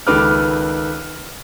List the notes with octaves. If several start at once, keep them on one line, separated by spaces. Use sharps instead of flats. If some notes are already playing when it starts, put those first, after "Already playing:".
C#2 D#3 A4 B4 D6 F6